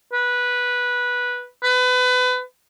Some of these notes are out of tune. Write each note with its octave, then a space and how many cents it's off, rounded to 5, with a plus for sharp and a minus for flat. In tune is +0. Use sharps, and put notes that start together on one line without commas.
B4 -10
B4 +30